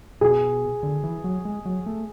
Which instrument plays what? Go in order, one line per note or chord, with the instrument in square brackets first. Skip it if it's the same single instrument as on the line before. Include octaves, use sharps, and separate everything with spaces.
[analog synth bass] B2 [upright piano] G#4
[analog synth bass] D3
E3
F#3
G#3
F#3
A3